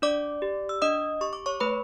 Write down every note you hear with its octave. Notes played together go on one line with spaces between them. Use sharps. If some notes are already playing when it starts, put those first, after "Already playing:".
D4 D5 D6
G4
E6
D4 D#5 D#6
G4 C#6
D6
C#5 C#6
A3 B4 B5